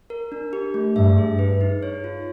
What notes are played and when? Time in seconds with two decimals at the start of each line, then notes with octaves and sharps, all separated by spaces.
0.10 A#4
0.32 D4
0.53 G4
0.74 A3
0.96 G2 E5
1.18 G#4
1.39 B4
1.61 D#4
1.83 C#5
2.04 F4